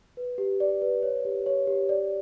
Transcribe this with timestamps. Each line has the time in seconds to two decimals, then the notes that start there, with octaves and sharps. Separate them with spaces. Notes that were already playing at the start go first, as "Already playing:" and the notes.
0.17 B4
0.38 G4
0.60 D5
0.82 B4
1.03 C#5
1.25 G4
1.46 C#5
1.67 G4
1.89 D5